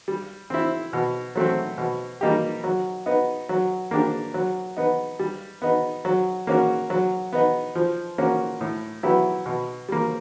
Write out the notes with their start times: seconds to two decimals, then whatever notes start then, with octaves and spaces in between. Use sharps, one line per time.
0.08 G3
0.50 C4 E4
0.93 B2
1.36 F#3 A3 C4
1.78 B2
2.21 G3 A#3 D#4 G4
2.64 F#3
3.06 B3 D#4
3.49 F#3
3.91 A#3 D4 G4
4.34 F#3
4.77 B3 D#4
5.19 G3
5.62 B3 D#4
6.05 F#3
6.47 A#3 C#4 F#4
6.90 F#3
7.33 B3 D#4
7.75 F3
8.18 A#3 C#4 F#4
8.61 A2
9.03 F#3 B3 E4 G4
9.46 B2
9.89 G3 A#3